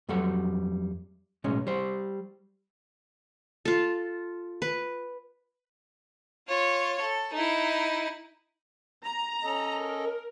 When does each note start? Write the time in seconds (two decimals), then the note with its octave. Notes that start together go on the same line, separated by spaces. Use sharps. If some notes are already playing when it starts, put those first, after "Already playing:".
0.09 F2 F#3 G3 F#4 A4 F#5
1.44 B1 A2 G#3 C#4
1.67 G3 C5
3.65 F4 A4
4.62 B4
6.48 F4 C#5
7.01 A4
7.33 D#4 E4
9.05 A#5
9.44 C#4 A4 D#5
9.81 A#4